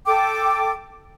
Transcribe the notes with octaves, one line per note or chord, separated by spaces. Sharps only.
A4 G5 D6